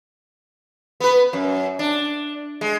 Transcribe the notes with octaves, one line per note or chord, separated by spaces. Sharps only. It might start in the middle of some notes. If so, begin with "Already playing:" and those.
B3 B4
F#2
D4
G#3